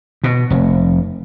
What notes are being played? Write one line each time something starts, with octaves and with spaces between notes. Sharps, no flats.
B2
F1